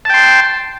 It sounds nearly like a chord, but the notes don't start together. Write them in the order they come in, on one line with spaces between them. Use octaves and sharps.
A5 G5 C6